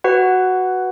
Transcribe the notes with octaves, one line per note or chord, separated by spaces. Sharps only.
F#4 B4 F#5